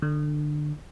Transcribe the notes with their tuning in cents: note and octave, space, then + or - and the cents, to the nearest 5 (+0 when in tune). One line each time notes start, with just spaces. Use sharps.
D3 +25